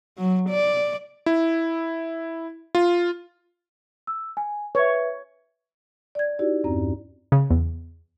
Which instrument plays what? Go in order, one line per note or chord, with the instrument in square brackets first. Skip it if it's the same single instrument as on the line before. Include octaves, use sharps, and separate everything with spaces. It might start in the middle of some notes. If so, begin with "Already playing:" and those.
[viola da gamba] F#3
D5
[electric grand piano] E4
F4
[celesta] E6
G#5
[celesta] B4 E5 [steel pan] C#5
[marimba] D5 G#6
D#4 E4 F#4 G4 D5
E2 G2 C4 C#4 A#5
[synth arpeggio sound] C#3
E2